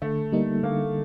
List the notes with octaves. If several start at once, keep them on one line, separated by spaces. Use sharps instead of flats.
D3 A3
G3 A#3 D#4
D3 A#3